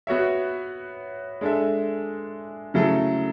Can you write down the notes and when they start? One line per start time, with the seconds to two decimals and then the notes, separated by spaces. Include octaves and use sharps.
0.07 B3 F#4 C#5 E5
1.41 G#3 D4 A4 E5
2.74 C#3 F#3 A3 E4 A4